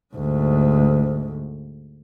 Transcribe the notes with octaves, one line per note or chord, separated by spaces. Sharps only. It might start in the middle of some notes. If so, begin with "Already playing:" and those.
D2 G#2